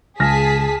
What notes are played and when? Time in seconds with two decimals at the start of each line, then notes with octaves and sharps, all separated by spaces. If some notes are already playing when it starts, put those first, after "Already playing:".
0.20 C#2 G#4 A5 F6 A#6 B6